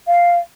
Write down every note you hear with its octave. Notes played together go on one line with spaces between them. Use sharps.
F5